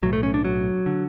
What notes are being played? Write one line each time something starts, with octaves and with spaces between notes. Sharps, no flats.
B1 A2 F#3
A3
C#4
D4
F#3
D3